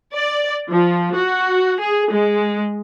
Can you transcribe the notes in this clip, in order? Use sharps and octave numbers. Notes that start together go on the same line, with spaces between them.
D5
F3
F#4
G#4
G#3